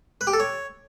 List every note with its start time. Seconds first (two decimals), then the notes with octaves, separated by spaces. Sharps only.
0.21 B4
0.27 G4
0.33 A4
0.40 C#5